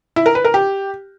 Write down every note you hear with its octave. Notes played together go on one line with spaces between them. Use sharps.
E4
A#4
B4
A#4
G4